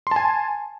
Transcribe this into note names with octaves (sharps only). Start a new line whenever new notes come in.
G#5 A5 C6